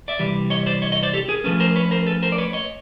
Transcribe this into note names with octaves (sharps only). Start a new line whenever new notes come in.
D5 E5
C3 E3 G3
C#5 D#5
C5 D5
C#5 D#5
C#5 D#5
C5 D5
G4 A4
G#4 A#4
F3 A3 C#4 A4 B4
A#4 C5
B4 C#5
A#4 C5
A4 B4
A#4 C5
D5
B4 C#5
C#5 D#5